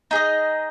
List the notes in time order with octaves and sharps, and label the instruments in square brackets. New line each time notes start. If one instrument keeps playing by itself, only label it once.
[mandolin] D#4 G#4 D#5